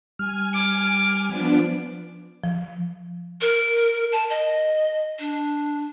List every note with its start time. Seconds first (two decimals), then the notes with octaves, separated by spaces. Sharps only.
0.19 G3 G#5 F6
0.54 D6
1.28 F3 B3 D4
2.44 F3
3.41 A#4
4.12 A5
4.30 D#5
5.19 D4